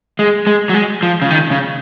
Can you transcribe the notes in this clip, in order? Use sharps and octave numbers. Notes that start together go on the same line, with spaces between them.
G#3
G#3
F#3
G#3
F3
C#3
D#3
C#3